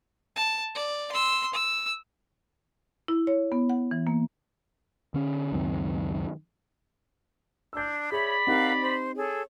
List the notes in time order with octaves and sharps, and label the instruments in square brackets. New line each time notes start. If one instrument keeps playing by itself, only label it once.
[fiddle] A5
D5
C6 E6
E6
[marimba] E4
C#5
B3
F#5
E3
A#3
[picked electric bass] D3 C#4
C#2 F#2 D#3 C4
[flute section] D4 [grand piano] E6 G6
[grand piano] G#4 [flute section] C#5 E5 [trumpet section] D5 B5
[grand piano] C4 D#4 G4 [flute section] A#4 F5 F#5
[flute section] C5
G#4 A4 C#5